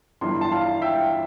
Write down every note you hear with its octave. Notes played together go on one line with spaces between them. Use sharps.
G1 G2 E3 C6
A5 C6
F5 A5
E5 G5